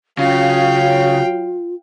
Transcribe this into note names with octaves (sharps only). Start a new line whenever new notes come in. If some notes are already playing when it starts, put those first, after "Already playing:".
C#3 F#3 F4 F5 G5